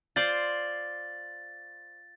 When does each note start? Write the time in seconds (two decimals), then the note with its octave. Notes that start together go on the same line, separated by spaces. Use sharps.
0.16 F4 C5 D5 A6